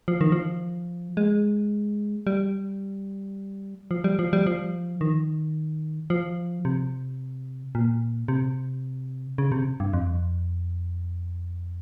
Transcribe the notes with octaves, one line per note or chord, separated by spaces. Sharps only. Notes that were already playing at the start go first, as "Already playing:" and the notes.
F3
D#3
F3
G#3
G3
F3
G3
F3
G3
F3
D#3
F3
C3
A#2
C3
C#3
C3
G2
F2